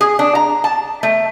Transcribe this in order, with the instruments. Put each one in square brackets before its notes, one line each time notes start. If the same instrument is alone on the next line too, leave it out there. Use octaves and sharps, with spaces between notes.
[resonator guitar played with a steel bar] G#4
D4
A#5
A5
A3